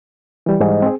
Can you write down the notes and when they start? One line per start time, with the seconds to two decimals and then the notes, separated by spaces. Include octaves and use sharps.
0.46 E3 G3
0.60 G#2
0.82 C4 G#4